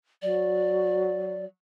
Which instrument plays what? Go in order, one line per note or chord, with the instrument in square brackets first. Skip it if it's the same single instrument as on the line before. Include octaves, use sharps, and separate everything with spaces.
[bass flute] F#3 [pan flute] D5